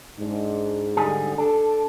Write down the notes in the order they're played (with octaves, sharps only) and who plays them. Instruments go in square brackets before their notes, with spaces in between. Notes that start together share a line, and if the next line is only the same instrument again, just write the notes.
[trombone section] G#2 [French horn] D4
[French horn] D3 [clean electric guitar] G3 G#4
[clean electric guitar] D4 [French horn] A4